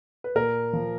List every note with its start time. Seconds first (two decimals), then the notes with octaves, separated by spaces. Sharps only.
0.24 B4
0.35 A#2 A#4
0.73 F3